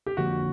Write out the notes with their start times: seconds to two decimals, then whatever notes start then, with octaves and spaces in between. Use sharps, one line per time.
0.06 G4
0.17 D3 F3 A#3 D4 F#4